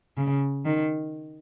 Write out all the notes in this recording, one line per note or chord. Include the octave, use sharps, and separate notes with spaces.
C#3
D#3